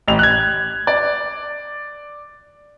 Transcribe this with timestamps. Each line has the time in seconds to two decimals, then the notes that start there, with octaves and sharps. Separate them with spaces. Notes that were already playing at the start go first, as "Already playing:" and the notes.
0.08 A1 F7
0.19 F#6 G#6
0.87 D5